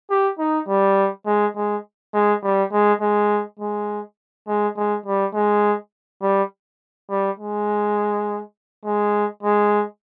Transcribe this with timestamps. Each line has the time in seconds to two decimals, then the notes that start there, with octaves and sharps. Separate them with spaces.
0.10 G4
0.39 D#4
0.68 G3
1.26 G#3
1.56 G#3
2.14 G#3
2.44 G3
2.73 G#3
3.01 G#3
3.60 G#3
4.48 G#3
4.77 G#3
5.06 G3
5.34 G#3
6.22 G3
7.10 G3
7.39 G#3
8.85 G#3
9.43 G#3